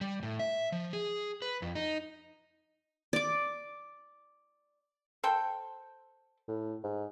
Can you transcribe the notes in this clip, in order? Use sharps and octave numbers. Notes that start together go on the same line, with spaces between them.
G3
A2
E5
F3
G#4
B4
F2
D#4
D5 D6
A4 C5 G5
A2
G#2